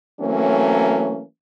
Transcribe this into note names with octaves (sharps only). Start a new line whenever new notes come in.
E3 F#3 A3 A#3 C4 C#4